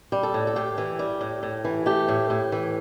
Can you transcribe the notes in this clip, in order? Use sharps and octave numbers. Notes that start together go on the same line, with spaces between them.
G3
A4
A2
A4
A2 G4
E3
G3
A2
A2
E3
A3 G4
A2
A2
E3